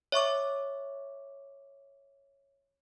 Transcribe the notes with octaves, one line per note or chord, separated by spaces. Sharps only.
C#5 E5 C#6 D6